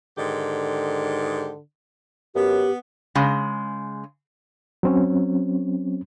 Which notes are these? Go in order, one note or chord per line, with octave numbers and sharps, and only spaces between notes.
G#2 D3 D#3 G4
F#2 B3 G4
C#3 G#3
F#3 C4 C#4